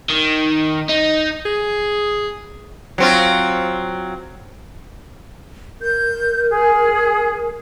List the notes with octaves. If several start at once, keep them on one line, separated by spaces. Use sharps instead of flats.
D#3
D#4
G#4
F#3 C4 F4
A#4 G6
G#4